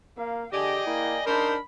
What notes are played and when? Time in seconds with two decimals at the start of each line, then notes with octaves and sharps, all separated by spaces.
0.17 A#3 F5
0.53 D3 G4 G#4 D5 D#5 G5
0.87 A#3 E4
1.27 C#3 D4 D#4 A#4 C5 B5